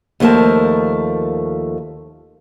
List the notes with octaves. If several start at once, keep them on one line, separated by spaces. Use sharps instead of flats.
D#2 F3 A3 A#4 A5